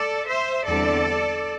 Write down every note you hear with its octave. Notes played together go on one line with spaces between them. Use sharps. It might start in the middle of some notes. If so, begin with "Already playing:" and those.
Already playing: A4 D5
C5 E5
E2 D3 G3 C4 E4 A4 D5